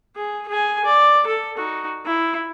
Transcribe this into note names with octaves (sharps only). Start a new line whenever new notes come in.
G#4
G#4 G#5
D5
A4
D#4 F#4
E4